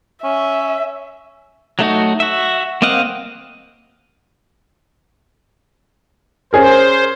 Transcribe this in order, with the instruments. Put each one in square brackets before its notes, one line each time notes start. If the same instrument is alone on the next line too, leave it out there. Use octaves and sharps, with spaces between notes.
[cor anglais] C#4 [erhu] E5
[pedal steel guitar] F#3 A3 D#4 F#4
F#4 E5
A#3 C4 D#5 F5 F#5
[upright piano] C#4 G#4 A#4 [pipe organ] C5